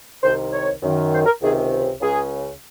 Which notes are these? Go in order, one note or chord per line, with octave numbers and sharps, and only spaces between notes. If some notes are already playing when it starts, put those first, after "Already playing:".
C2 C3 D#3 C5
C#5
F#2 D#3
C5
A#4
C#2 C3 D#3 G#4
C#2 C#3 G#4